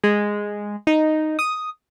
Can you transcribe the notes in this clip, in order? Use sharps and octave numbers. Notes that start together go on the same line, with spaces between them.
G#3
D#4
D#6